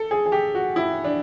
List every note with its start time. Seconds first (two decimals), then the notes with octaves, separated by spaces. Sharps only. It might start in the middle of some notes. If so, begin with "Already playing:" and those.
Already playing: A4
0.11 G#4
0.26 G#4
0.32 G4
0.55 F#4
0.76 E4
1.04 D4